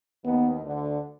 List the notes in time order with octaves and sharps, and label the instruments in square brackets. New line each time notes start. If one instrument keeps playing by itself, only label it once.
[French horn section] D#2 D#3 [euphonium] B3
[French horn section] D2 D3